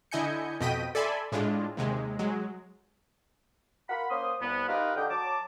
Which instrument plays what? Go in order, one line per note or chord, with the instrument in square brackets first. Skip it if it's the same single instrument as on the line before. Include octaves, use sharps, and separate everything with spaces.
[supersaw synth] D3 E4 D#5 G#5 G6 C#7
F2 B2 D#5 G5 B6 D#7
A4 D5 E5 G#5 B5 C6
A2 G#3 D4 F4
D#2 C3 G#3
F#3 G#3
[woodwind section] F4 A#4 F#5 B5
A#3 C#4 C5 C6 D#6
C2 B3
D#4 F4 G4 A#4 B4 F5
D3 D#5 G5
F#3 A5 D6